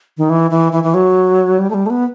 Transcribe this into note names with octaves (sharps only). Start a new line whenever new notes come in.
D#3
E3
E3
E3
E3
F#3
G3
A3
G3
A3
B3